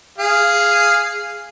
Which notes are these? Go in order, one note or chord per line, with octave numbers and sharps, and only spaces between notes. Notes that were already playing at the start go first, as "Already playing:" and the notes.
G#4 F5